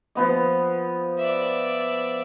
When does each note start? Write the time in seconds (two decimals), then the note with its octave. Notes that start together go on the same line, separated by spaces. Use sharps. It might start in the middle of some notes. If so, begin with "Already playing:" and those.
0.15 F3 B3 D#5
1.19 D5 E5